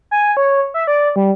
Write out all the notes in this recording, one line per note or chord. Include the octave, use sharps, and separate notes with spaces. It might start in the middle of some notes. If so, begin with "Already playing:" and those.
G#5
C#5
E5
D5
G3